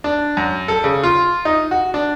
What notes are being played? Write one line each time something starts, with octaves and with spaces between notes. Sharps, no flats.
D4
F#2
A4
C#3
F4
D#4
F#4
D4